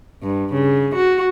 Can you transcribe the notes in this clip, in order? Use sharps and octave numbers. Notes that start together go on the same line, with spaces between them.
G2
C#3
F#4